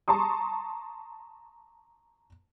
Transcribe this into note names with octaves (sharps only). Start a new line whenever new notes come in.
A5 A#5 C6 C#6 D#6